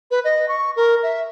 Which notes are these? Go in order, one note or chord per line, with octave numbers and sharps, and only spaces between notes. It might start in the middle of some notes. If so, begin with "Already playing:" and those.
B4
D#5
C#6
A#4
E5